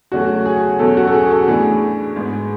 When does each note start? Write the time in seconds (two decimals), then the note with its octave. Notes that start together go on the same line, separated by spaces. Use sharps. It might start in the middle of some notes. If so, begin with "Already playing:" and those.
0.12 E2 C#3 F#3 A3 C#4 F#4
0.46 G#4
0.79 E2 B2 F#3 C#4 A4
0.97 F#4
1.08 A4
1.14 G#4
1.31 A4
1.48 A2 E3 B3 D4 G#4
2.16 G#2 G#3 B3